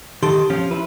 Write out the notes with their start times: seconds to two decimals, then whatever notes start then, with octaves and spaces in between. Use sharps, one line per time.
0.23 D#3 G4 A4 C6
0.50 F3 C#4 F4
0.71 E4 B4